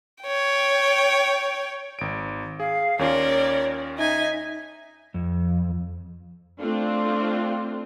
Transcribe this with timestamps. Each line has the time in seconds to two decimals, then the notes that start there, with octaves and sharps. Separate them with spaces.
0.24 C#5 G5
1.99 G#1 D7
2.60 G#4 F5
2.99 D#2 C#4 F4 A#4 C#5 D5
3.98 D#4 E5 G#5
5.14 F2
6.60 A3 C4 D4 F4